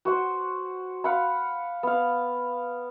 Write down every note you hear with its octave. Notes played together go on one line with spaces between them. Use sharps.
F#4 C5 F#5
F5 F#5 B5
B3 F5